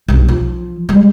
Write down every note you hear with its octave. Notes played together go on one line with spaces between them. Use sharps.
B1 G2
F3
G3 G#3